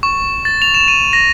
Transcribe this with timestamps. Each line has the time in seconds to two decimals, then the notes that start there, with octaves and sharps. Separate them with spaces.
0.03 C#6
0.45 A6
0.62 F7
0.74 E7
0.88 D#7
1.13 A#6